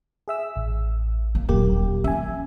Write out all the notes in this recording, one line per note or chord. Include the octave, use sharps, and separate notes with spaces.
G#4 E5 E6
A1
A#3
D#1 F#3 A#3 G4
C#4 E5 G#5